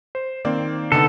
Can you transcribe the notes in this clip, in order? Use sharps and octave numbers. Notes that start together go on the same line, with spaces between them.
C5
D#3 A#3 C4 D5
D3 B3 D#4 A4